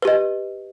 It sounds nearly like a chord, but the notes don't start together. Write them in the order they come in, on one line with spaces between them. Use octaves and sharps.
B4 G4 D#5